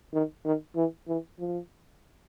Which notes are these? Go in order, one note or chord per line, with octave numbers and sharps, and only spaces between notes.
D#3
D#3
E3
E3
F3